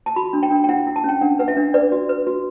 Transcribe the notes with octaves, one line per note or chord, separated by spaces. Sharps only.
A5
F#4 B5
D4
G5
D4
G5
E4 F#5
E4
A5
C#4 G5
D4 F#5
B4 F#5
E5
D4
B4 D5
F#4
B4
F#4